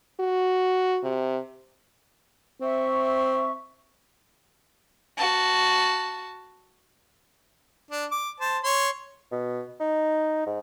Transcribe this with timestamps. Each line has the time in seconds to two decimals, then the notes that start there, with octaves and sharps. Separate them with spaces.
0.20 F#4
1.04 C3
2.61 C4 E5 C#6
5.17 F#4 A5
7.91 D4
8.12 D6
8.40 C5 A5
8.64 C#5 C6
9.32 B2
9.80 D#4
10.47 G#2